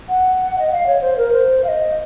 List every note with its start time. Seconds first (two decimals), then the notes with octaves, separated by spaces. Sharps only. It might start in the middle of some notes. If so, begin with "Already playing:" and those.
0.09 F#5
0.58 D#5
0.71 F5
0.86 C#5
1.01 C5
1.17 A#4
1.32 C5
1.64 F5
1.68 D#5